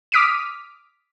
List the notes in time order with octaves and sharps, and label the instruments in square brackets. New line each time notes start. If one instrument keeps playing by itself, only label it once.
[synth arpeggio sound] D6 D#6 F6 B6 D7 D#7